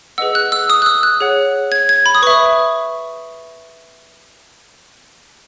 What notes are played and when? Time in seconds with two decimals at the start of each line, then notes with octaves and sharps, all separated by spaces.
0.18 G#4 B4 D#5 F#5 E6
0.35 F#6
0.52 E6
0.70 D#6
0.82 F#6
0.86 E6
1.03 F#6
1.21 G#4 C#5 F#5
1.72 G#6
1.89 G#6
2.06 B5
2.15 D#6
2.23 B4 E5 C#6